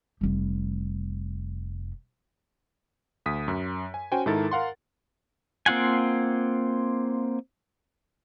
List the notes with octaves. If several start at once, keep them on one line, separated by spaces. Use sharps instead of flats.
F1 G3
D2 D#6 B6
F#2
G#5
C#4 F#4 C5 G5 G#5
G#2 D#3 E4 A4 A#4 A6
A#4 F5 F#5 C6
A#3 C4 F4 F#5 G#5